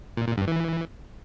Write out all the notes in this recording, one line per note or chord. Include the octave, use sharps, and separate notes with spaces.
A#2
A#2
G2
E3